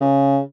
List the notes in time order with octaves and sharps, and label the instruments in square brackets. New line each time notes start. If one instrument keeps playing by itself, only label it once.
[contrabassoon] C#3